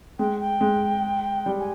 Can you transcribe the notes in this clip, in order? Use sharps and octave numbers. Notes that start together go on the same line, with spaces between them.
G#3 G5
G5
G#3
G3
G#5